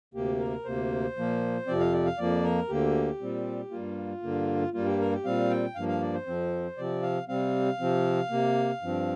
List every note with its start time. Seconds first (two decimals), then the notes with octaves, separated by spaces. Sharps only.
0.14 D2 C3 A#3 G4
0.40 A#4
0.65 D2 C3 A#3 C5
1.16 A#2 F3 A#3
1.67 F2 C3 F3 C4 D5
1.80 F5
1.93 D5
2.05 F5
2.18 F2 F3 A#3 D5
2.44 A#4
2.69 D2 D3 A#3 G4
3.21 A#2 G3 C4
3.71 G2 G3 A#3 F4
4.23 G2 D3 A#3
4.73 G2 G3 A#3 F4
4.86 G4
5.00 A#4
5.12 G4
5.25 A#2 G3 C4 F5
5.50 G5
5.75 G2 F3 A#3 F5
5.88 F5
6.01 D5
6.14 C5
6.26 F2 F3 C4
6.77 C3 F3 C4 D5
7.03 F5
7.28 C3 G3 C4 F5
7.80 C3 F3 C4
8.30 C3 A#3
8.82 G2 F3 C4